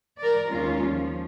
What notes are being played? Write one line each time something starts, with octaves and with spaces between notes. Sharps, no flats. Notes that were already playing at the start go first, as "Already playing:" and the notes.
A#4 D5
D#2 G#3 C#4 F4
F3